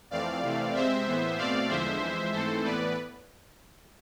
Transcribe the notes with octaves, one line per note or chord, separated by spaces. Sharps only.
F2 E3 A3 C4 D5 F5
C3 E3 A3 C4
C3 G#3 C4 C5 E5
A2 E3 B3
B2 A3 C4 D5 F5
E2 D3 F3 G#3 C5 E5
F2 E3 G#3
G#2 E3 A3 C4 A4 C5
A2 E3 B3 B4 D5